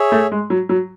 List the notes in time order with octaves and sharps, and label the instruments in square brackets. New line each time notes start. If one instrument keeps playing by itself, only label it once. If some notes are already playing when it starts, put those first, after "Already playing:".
Already playing: [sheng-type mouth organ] G#4 C#5 E5
[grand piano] A3
G#3
F#3
F#3